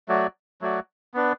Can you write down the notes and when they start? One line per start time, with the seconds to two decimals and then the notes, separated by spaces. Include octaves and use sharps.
0.08 F#3 A3 F#4 D5
0.61 F#3 A3 F#4 D5
1.14 B3 D4 B4